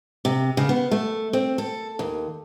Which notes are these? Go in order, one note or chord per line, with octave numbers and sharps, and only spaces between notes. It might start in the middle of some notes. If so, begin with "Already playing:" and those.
C3
C#3
B3
A3
C4
A4
D#2